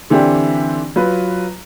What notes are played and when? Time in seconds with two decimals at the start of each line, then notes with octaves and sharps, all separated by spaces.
0.10 D3 E3 C4 D4 G4
0.96 F#3 F4 B4